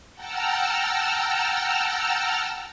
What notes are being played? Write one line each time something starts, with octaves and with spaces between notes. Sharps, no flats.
F#5 G5 A5 A#5 E6 F6